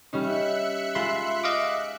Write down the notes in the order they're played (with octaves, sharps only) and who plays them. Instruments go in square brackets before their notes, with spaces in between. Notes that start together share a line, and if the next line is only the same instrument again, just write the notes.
[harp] G3 C#4 D#4 [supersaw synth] E5 F#6 C#7
[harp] G#3 [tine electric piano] F4 B5 C6
[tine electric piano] D#5 F5 D6